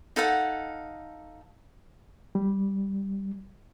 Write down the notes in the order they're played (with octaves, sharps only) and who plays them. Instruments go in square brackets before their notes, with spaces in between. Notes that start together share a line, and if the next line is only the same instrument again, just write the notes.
[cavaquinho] D#4 A4 F5 F#5
[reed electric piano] G3